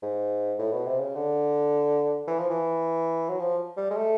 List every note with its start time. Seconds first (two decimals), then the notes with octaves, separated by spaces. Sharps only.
0.03 G#2
0.59 A2
0.73 B2
0.86 C3
1.00 C#3
1.15 D3
2.27 E3
2.39 F3
2.50 E3
3.29 F#3
3.40 F3
3.77 G3
3.91 G#3
3.97 A3